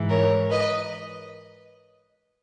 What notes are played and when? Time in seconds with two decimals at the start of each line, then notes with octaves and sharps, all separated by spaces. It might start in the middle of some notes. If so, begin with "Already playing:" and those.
Already playing: G#2 E3
0.09 A#4 C#5
0.50 B4 D#5